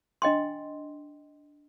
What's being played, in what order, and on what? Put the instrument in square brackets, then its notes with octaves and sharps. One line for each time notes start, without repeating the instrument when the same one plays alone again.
[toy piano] D4 D#5 G5 C6